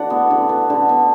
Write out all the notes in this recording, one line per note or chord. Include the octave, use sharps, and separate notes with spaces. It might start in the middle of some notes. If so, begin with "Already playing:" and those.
Already playing: D3 E3 A3 F#4 D5 F#5
B3
D3
B3
D3
B3